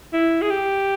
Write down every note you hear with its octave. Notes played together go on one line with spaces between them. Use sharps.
E4
G#4
G4